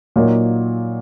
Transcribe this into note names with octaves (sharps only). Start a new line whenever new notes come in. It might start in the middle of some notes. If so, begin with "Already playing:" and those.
A#2 F#3 A#3 D#4